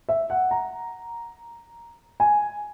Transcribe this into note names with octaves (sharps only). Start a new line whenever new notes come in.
E5
F#5
A#5
G#5